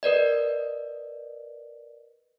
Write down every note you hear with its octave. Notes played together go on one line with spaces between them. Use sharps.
A#4 B4 D5 D#5